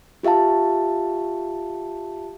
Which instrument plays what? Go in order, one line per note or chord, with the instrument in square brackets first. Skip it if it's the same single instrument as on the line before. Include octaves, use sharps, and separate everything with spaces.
[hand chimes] F4 G4 E5 F5 A5